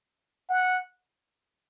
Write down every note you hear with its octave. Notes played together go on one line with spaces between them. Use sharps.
F#5